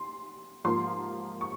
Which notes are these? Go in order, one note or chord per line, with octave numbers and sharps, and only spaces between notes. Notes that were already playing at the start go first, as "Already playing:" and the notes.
Already playing: C6
G#2 F3 A#3 F4 C6
C#6